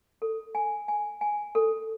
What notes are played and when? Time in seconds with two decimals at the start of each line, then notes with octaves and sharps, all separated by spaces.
0.22 A4
0.55 G#5
0.88 G#5
1.21 G#5
1.55 A4